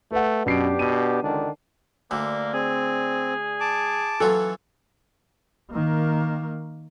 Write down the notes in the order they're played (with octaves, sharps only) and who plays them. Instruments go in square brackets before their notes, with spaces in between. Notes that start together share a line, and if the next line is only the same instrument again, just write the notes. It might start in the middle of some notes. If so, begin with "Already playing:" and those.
[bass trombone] A3 [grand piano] B4 F#5
[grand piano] F#2 C7 D7 [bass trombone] B2 [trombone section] B3 D4 G4
[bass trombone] B2 [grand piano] D#7
[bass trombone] C#2 [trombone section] D3 D#3 D4
[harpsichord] D2 D3 [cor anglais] A#3
[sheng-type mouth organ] C4 [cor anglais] G#4
[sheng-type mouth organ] A5 D6
[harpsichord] E3 F#3 F4 [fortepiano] A4
[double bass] D#3 A#3